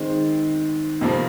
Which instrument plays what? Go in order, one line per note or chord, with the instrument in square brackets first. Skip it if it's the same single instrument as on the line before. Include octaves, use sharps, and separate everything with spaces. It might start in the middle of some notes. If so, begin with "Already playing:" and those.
Already playing: [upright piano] D#3 G#3 C4
F2 C3 F3 A#3